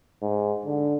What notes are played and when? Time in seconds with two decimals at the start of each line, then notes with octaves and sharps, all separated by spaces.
0.22 G#2
0.65 D3